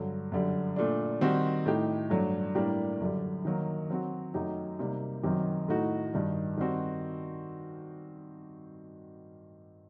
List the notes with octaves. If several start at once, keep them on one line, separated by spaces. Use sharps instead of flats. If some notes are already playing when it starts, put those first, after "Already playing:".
Already playing: G2 D3 F#3
F#2 D3 G3
A#2 A3 D4
D#3 G3 C4 F#4
A2 A3 D#4 G4
G2 F#3 A3 D4
A2 G3 A#3 D4 G4
F#2 D3 G3
D#3 F#3 A#3
F#3 C4 F#4
F#2 F#3 A3 D#4 G4
C3 G3 A#3 D#4
F#2 D#3 F#3 C4 G4
A2 A3 D#4 F#4
G2 D#3 G3
D#3 G3 C4 F#4